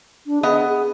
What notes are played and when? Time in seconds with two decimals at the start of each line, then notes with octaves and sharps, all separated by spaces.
0.27 D4
0.43 B3 G#4 D#5
0.69 G#4